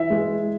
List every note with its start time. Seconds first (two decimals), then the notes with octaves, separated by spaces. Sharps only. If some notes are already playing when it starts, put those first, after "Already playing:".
Already playing: E3 E5
0.10 G#3